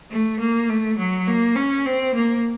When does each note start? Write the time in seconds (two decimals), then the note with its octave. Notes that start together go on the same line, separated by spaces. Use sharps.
0.11 A3
0.39 A#3
0.69 A3
0.98 F#3
1.27 A#3
1.56 C#4
1.86 C4
2.15 A#3